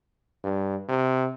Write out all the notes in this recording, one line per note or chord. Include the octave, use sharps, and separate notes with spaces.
G2
C3